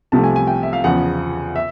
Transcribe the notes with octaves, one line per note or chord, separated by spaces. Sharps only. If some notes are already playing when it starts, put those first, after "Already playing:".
C2 C3 F3 A3 A5
G#5
G#5
G5
E5
F5
E2 C#3 F3 F#5
E5